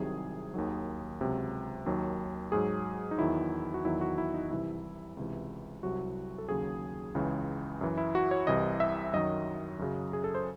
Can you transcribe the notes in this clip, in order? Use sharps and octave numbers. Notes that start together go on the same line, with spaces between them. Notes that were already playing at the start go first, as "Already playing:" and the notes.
Already playing: C2 C3 D#3 F#3 G#4
D#2 D#3 F#3
C#2 C3 F#3
D#2 D#3 F#3
G#2 F#3 G#4
D#4
E2 D#3 F#3 E4
F#4
E2 D#3 F#3 E4
F#4
E4
D#4
C2 C3 E3 E4
C#2 C3 E3
C2 C3 F#3 F#4
A4
D#2 C#3 F#3 G#4
C#2 C#3 E3
F#2 E3
E4
F#4
C#5
C2 C3 E3 D#5
E5
F#2 D#3 F#3 D#5
F#2 C#3 F#3
G#4
A4
C5